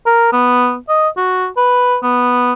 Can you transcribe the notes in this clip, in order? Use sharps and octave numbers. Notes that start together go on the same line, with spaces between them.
A#4
B3
D#5
F#4
B4
B3